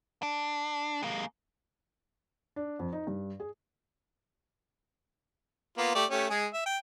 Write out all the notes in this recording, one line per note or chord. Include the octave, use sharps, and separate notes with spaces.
D4
G#3 A#3
D4
F2
D#4
G2
G#4
A#3 B3 F4
A3 G4 D5
A3 C#4 G4
G#3 G#4
E5
G5